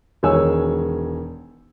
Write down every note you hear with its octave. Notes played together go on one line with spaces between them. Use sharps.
E1 D#3 G#3 C#5 G#5 E6